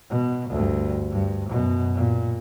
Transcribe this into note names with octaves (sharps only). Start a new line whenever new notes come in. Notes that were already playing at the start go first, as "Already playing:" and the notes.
B2
D2 G2
G2
F#2 B2
A#2